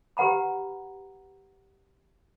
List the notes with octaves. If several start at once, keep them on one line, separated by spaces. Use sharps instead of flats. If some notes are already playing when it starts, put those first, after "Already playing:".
G4 B4 F#5 A#5 B5